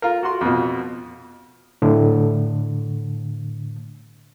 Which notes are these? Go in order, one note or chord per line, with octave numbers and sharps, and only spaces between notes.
F4 A#4
F#4 C6
F2 B2
A2 D3